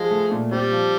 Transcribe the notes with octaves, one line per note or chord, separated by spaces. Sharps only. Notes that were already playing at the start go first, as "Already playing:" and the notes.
Already playing: F3 G#3
A3
A#2
G3 C4
F3